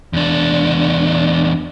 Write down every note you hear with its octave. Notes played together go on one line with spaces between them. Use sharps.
E2 D4